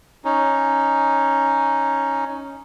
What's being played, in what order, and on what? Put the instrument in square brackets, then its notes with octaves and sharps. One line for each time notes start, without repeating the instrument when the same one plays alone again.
[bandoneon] C#4 D#4